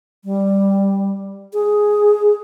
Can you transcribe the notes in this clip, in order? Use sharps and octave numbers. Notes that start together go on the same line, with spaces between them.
G3
G#4